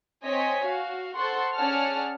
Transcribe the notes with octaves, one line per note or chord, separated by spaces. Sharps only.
C4 C#5 D#5 G#5 B6
F#4 F5
A4 C5 F#5 C6 C#6
C#4 G#4 D5 F#5 A5 F6